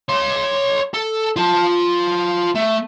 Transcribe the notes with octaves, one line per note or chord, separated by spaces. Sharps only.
C#5 C6
A4
F4 A5
A3